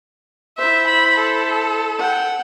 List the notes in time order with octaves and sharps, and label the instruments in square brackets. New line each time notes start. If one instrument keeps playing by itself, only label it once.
[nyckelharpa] E4 C5 [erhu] E5
[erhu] B5
A4
[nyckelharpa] F#5 G5